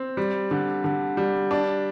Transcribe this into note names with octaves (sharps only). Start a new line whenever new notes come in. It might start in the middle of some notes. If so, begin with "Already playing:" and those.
Already playing: C4
G3
D3
D3
G3
D4